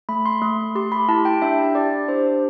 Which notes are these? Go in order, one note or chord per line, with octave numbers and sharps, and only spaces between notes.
A3 B5
C6
A3 C6
G4 C6
B5
E4 A5
G5
D4 E5
G4 D5
D4 C5